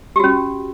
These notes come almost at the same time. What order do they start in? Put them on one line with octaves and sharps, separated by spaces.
G4 F#4 C#4